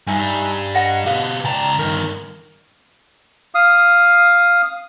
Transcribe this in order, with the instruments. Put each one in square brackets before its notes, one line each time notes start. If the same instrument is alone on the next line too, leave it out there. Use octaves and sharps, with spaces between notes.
[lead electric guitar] G2 G3 [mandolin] D#4 E5 G#5
[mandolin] D#5 F#5 A#5
[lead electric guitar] B2 G4 [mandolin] B4 D#5 F5
[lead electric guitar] C#2 A#5 [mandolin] D5 G5 A5
[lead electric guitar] G2 D#3 [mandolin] A#4
[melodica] F5 D#6